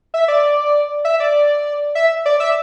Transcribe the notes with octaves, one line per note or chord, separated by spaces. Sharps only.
E5
D5
E5
D5
E5
D5
E5